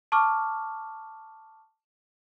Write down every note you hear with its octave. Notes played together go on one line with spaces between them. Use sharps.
A5 C#6 D6 F6